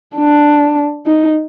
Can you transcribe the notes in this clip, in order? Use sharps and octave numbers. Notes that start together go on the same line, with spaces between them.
D4
D#4